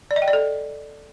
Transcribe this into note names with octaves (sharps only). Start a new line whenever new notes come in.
D5
D#5
G5
D5
A4